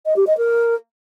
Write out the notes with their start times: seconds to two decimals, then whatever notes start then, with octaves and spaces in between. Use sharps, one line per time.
0.06 D#5
0.16 G4
0.27 D#5
0.38 A#4